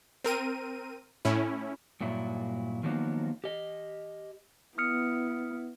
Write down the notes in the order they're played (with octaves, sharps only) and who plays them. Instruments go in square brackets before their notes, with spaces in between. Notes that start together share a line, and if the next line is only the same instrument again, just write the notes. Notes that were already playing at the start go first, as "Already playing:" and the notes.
[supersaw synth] C4 A#4 D#7
A2 C#4 E4
[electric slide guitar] G2 A#2 F#3 E4
D#3 F3 F#3 A#3 B3 D#4
G4 D#5
[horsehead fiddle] B3 E4 [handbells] D#6 F6 C#7